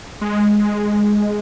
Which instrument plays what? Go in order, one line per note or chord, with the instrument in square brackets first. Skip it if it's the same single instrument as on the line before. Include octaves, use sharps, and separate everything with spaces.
[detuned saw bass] G#3